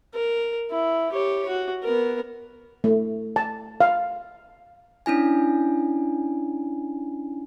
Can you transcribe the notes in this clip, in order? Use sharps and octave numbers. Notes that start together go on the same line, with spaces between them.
A#4
E4
G4 C#5
F#4
B3 A#4
A3
A5
F5
C#4 D4 E4 G#5